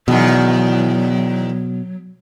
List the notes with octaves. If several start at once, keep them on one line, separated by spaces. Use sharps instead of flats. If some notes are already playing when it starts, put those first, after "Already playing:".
E2 B2 D#3 F#3